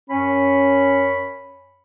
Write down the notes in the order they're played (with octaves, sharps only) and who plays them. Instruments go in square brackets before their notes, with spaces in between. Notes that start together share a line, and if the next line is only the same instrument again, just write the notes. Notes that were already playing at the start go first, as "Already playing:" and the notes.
[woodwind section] F#2 C#5 B5 [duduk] C#4